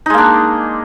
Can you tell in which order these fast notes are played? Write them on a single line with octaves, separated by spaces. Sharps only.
D#4 G#3 A#3 D4